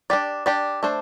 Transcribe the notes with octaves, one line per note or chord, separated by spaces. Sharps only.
D4 G4 D5
D4 G4 D5
A3 D4 C5